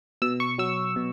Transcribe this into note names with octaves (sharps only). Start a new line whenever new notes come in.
B2 E6
C#6
F#3 E6
B2